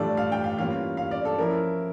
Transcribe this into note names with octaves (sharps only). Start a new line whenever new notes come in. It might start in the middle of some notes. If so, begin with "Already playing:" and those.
Already playing: A2 E3 G3 D4 F4 A4 D5
F5
G5
F5
E3 G3 A#3 C#4 F4 F5
F5
D5
A4
F3 C#4 E4 A#4